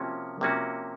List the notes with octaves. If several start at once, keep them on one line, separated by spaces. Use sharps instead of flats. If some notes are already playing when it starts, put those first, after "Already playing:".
Already playing: C3 F3 A#3 C#4 F#4
C3 F3 A#3 C#4 F#4